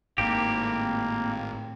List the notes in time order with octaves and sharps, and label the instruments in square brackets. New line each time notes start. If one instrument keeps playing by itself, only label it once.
[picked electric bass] G#1 [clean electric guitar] A2 C4 G4 [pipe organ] A#3